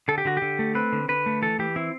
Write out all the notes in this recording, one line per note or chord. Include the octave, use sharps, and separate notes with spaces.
D3 A4
G4
D3 F#4
D3 G4
A3
C4 B4
D3
D3 B4
A3
E3 A4
E3 G4
C4 E4